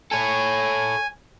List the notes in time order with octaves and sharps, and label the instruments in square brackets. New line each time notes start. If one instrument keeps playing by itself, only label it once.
[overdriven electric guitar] A4 C#5 [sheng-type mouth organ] G#5